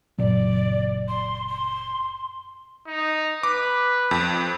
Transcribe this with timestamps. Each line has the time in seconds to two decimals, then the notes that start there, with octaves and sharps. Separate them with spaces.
0.19 F#1 A#2 F#3 D5
1.08 C6
1.48 C6
2.87 D#4
3.43 B4 D6
4.11 F2